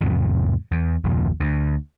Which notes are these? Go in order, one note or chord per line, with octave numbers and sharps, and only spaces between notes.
E2 G#2 C3 F3
E2
F#1 D#2 A#2 F3
D2